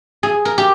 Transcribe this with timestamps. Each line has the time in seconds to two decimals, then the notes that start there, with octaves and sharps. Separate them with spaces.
0.23 G#4
0.45 A#4
0.58 G4